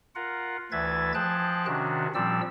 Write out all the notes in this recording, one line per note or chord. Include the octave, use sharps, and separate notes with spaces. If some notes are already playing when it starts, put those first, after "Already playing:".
F4 A#4 F#5
D2 E3 B4 E5 G#6 A6
F3 G#4 G5 A5 F#6
C3 D#3 C#4 D4 F#4
A#2 F3 G3 C4 D5 E6